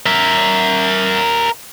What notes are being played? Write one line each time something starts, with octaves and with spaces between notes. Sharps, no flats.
A#4 E5